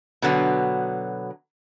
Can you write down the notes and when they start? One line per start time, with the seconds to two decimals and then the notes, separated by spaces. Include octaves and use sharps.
0.22 B2 D3 F#3 B3